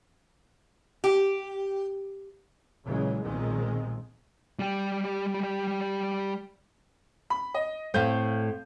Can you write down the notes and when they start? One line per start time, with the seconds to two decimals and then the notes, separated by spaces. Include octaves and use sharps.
1.04 G4
2.85 A#1 C#3 E3 F#3 G#3
3.23 B1 A#2 D#3 F3 G#3 C4
4.59 G3 G4
7.30 B5
7.54 D#5
7.94 A2 A3 C4 F5 G6